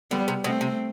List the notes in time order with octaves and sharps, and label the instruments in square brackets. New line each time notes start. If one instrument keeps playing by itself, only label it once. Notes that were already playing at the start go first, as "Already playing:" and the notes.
[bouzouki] D3 [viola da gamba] G3 B3
[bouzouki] C3
[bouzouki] B2 [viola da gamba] A3 C4
[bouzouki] C3